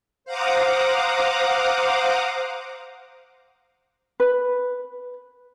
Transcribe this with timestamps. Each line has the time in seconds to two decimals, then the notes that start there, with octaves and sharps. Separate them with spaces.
0.25 C5 F5 F#5 A#5 D6 D#6
4.20 B4